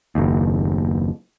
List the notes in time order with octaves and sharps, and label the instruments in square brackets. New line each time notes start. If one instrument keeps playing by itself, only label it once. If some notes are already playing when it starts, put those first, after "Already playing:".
[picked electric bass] F#1 D#2